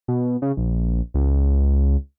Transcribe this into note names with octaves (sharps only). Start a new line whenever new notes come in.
B2
C#3
A#1
C#2